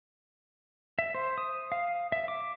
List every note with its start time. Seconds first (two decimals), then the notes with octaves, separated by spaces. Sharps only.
0.99 E5
1.15 C5
1.38 D#6
1.72 F5
2.12 E5
2.28 D6